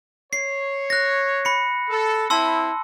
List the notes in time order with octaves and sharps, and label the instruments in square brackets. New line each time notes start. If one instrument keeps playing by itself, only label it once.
[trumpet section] C#5 [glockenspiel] C7
[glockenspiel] F#6 A#6
B5 C#7
[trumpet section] A4
[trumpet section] C4 E4 [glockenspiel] A5 C6 E6